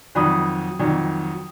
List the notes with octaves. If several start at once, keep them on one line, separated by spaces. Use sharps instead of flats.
F2 D#3 F#3 B5 D#6
F2 D#3 F#3